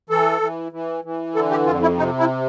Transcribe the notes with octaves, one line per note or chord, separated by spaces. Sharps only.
E3 A4
E3
E3
E3
D3 A4
G4
F2 F4
E4
C3 D#4
E4